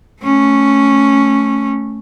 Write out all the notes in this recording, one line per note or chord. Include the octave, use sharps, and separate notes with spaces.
A3 C#4